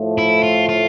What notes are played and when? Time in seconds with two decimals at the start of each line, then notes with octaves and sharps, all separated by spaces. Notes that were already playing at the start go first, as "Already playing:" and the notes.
Already playing: A2 F3 A3
0.18 E4
0.43 F4
0.69 F4